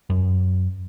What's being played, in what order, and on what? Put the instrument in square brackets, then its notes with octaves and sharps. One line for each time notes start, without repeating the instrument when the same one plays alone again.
[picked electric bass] F#2